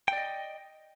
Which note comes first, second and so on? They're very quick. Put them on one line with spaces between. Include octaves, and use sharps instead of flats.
G5 D5 D#5